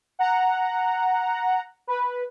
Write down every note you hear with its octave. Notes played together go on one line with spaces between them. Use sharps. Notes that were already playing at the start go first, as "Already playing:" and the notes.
F#5 A#5
B4